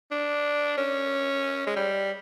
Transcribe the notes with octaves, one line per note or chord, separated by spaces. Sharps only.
D4
C#4
G#3
G3